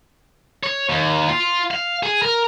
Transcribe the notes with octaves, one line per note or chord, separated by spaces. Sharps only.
C#5
D#2
F4
F5
G#4
A#4